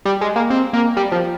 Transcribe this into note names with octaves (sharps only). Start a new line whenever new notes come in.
G3
G#3
A#3
C4
A#3
G3
F3